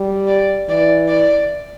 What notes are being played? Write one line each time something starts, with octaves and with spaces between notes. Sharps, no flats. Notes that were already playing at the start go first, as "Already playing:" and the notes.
Already playing: G3
D5
E3 D5
D5